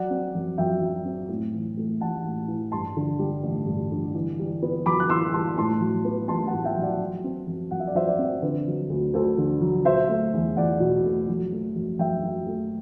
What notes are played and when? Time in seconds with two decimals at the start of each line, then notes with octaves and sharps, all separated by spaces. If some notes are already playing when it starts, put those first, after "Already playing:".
Already playing: F#3 D5 F#5
0.10 C4
0.35 F#2
0.58 F#2 E5 G5
0.81 F#3
1.05 C4
1.29 A2
1.53 E3
1.77 A3
2.01 A1 F#5 A5
2.25 A2
2.48 E3
2.72 G2 A5 C6
2.97 D3
3.19 G3
3.43 A1
3.67 G2
3.92 D3
4.14 E3
4.39 G3
4.62 B3
4.86 F#2 B5 D6
5.00 F#6
5.09 E3 C6 E6
5.33 G3 A5 C6
5.58 A2 A5 C6
5.81 F#3
6.05 B3
6.28 A1 A5 C6
6.47 F#5 A5
6.53 A2
6.65 E5 G5
6.77 F#3
6.83 D5 F#5
7.00 F#3
7.24 C4
7.47 F#2
7.71 F#2 F#5
7.79 E5
7.87 D5
7.95 F#3 C5 E5
8.07 D5 F#5
8.18 C4
8.42 D3 B4
8.67 F#3
8.90 D2
9.14 D2 A4 C5
9.38 D3
9.61 F#3
9.85 B2 C5 E5
10.09 A3
10.34 E2
10.56 E2 D5 F#5
10.80 B2
11.04 A3
11.29 F#3
11.52 A3
11.76 F#2
11.99 F#2 E5 G5
12.23 F#3
12.47 A3